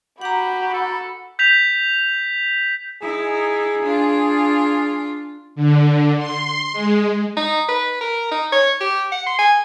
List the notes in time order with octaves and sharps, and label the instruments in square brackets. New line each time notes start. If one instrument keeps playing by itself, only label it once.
[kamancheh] F#4 B5 [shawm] G4 [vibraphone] F#5 A#5
[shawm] A4
[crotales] G6 B6 F7
[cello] D#4 E4 [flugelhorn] G#4
[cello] D4 F4
[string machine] D3
C6
G#3
[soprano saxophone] D#4
B4
A#4
D#4
C#5
G4
F#5
C6
G#5